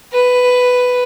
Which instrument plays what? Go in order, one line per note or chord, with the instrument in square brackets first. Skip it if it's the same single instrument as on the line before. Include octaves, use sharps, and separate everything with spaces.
[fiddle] B4